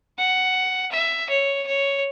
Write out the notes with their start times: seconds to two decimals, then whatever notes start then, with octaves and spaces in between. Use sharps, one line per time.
0.18 F#5
0.92 E5
1.30 C#5
1.67 C#5